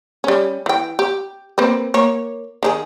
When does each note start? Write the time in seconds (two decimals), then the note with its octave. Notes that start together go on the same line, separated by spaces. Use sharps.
0.24 G3 C#4
0.66 E3 G5
0.99 G4
1.58 A#3 C4 B4
1.94 A#3 C#5
2.63 D#3 D4 G#4